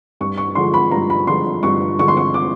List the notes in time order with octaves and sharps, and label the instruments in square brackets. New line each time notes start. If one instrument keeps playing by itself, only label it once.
[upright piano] G2 C#6
C#6
D3 F3 G#3 C6
B5
G2 A#5
B5
D3 F3 G#3 C6
G2 C#6
D3 F3 G#3 C#6
C6
C#6
D6